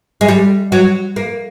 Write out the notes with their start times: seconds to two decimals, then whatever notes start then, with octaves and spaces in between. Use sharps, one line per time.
0.21 G#3
0.28 G3
0.72 F#3
1.16 A#3